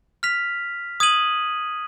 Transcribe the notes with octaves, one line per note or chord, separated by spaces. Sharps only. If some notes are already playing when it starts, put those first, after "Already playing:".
F6 B6 F7
D#6 G#6 D#7 F#7